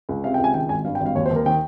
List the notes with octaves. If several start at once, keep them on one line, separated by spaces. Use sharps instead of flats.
C#2
C3 F5
G5
C#2 G#5
D#3 G5
G#1 G#5
G2 F5
G5
G#1
F5
D#2 C#5
C5
D#2
A#4
D#3 G5